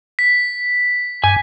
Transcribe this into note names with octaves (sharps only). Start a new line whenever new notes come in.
B6
G2 G#5